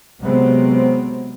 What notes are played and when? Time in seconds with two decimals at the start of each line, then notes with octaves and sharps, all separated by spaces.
0.22 C3 F#3 G#3 B3 C4